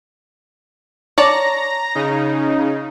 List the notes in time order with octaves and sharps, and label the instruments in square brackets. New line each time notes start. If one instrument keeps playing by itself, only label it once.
[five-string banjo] C#5 D5 A5 [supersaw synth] A#5 A#6
[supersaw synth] C#3 D#4